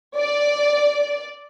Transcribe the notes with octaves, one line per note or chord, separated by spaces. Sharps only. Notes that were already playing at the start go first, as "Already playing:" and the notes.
D5